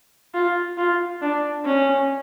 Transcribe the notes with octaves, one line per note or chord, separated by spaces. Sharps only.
F4
F4
D4
C#4